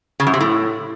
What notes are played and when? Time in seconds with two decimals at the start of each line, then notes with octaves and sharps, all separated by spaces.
0.20 C#3
0.27 F#2
0.34 C3
0.41 A2